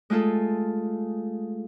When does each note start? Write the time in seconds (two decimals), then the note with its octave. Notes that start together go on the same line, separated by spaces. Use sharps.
0.10 G#3 A3 F4 G#4 A4